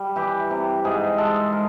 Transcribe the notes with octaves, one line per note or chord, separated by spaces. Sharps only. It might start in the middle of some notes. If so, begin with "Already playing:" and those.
Already playing: G3
E3 G4
C3
G#2 G#4
G#3 A4
G#3 A#4